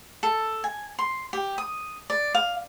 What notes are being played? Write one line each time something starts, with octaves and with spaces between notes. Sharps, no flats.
A4
G#5
C6
G4
D#6
D5
F5